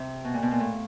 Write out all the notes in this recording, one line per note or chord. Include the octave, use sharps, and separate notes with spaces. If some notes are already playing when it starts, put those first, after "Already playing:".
Already playing: C3
B2
A#2
B2
A#2
A2